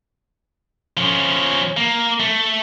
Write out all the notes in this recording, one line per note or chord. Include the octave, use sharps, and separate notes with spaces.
F3 C#4
A#3
A3